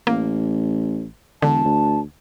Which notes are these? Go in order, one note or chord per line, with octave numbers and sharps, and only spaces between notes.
A1 A#3
E1 D3 A5
D2